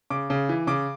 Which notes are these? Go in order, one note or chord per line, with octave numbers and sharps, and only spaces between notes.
C#3 D6
C#3
E3
C#3 D6